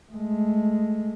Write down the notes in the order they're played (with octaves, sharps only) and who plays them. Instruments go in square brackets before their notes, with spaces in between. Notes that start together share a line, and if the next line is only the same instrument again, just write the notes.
[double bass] G#3 A3